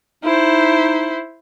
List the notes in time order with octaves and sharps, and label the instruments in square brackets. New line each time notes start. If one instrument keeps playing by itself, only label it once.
[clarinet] D#4 [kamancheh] E4 C5